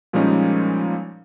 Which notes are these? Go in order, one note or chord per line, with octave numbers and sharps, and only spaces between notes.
A#2 F3 G3 G#3 C#4 D#4